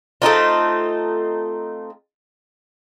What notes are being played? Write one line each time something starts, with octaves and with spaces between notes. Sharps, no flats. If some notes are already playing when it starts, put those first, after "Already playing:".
A3 C4 D#4 F4